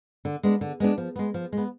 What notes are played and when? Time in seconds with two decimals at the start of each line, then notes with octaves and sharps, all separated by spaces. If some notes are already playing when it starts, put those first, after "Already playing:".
0.25 D3
0.43 G#3 B3 D4
0.61 D3
0.80 G#3 B3 D4
0.98 F3
1.16 G#3 B3
1.34 F3
1.53 G#3 B3